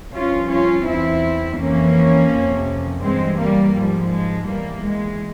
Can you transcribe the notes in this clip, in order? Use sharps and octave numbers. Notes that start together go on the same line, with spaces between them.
G2 F3 C#4 F4
C#4 F4
E2 E3 C4 E4
F2 E3 A#3 C#4
F2 C3 F3
G2 E3 G#3 C4
G3 A#3
G#2 F3 G3
G#3
E2 E3 G3 A#3
G#3